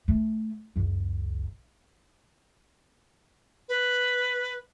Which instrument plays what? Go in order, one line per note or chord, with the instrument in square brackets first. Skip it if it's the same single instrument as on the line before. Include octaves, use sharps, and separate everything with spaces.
[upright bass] A3
F#1 C#2
[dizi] B4